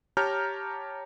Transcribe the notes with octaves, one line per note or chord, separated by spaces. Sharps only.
G4 C#5 A5 A#5 F6 G6